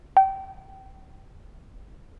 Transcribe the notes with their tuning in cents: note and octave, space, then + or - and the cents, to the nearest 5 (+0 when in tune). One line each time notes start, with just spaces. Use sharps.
G5 -25